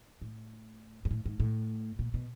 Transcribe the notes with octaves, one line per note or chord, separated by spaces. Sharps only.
A2
G#2
A2
G#2
A2
A#2
B2